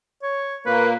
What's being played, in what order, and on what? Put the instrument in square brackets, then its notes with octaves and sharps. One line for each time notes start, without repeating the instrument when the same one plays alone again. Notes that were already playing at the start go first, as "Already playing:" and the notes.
[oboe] C#5
[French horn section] A#2 A#3 [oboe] B4